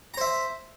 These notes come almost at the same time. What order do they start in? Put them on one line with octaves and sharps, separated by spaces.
A#5 C5 E5